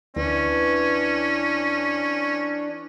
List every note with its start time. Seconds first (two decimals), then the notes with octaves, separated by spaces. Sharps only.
0.16 D2 E3 C#4 D4